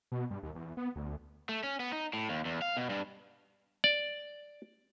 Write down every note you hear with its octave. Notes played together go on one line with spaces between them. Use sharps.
B2
G2
D#2
E2
B3
D2
A3
C#4
B3
D#4
A2
D#2
E2
F5
B2
G2
D5